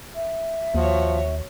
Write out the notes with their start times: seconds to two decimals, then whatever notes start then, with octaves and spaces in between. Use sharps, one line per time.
0.15 E5
0.75 D#2 F3 F#4 C#5